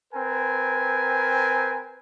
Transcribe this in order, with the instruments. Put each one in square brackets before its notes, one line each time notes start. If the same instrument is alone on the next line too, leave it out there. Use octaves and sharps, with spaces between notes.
[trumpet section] C4 A#4 B4 G#5